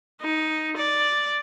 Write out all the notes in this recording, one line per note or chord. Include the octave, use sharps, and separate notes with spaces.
D#4
D5